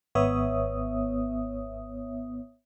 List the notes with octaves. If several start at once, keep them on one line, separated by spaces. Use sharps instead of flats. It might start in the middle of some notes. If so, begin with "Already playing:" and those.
G#1 B3 C#5 E5 D#6